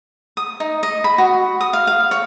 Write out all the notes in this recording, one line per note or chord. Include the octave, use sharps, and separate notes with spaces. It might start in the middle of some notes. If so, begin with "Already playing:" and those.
D#6
D#4
D#5
B5
F#4
D#6
F5
F5
C#5